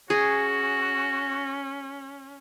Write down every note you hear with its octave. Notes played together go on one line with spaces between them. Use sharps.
C#4 F#4 G#4